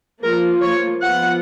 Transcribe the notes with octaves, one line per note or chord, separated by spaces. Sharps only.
F3 A#3 F4 A#4
C#5
F3 B3 F4 F#5